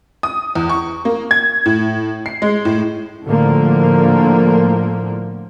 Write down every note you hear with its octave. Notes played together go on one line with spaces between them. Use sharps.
D#6
E2
C#6
A#3
G#6
A2
C7
G#3
A2
A2 D3 F3 A#3